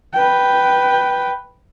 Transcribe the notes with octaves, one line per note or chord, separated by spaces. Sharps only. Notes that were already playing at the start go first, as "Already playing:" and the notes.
B4 G5